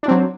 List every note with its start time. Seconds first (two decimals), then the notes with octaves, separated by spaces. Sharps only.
0.03 D4
0.06 D#3
0.08 C4
0.11 F#3